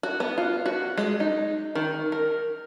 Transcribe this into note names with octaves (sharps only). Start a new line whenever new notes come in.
F#4
B3
F4
F#4
G#3
D#4
D#3
A#4